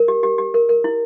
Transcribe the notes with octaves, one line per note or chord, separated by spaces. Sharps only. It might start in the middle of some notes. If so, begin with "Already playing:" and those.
Already playing: A#4
G4
G4
G4
A#4
A#4
E4